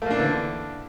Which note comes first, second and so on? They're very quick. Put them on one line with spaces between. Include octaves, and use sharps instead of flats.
A3 A#3 D4 E3 D3